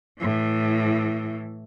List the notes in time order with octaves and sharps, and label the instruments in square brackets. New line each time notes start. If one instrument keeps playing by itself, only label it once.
[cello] A2 E3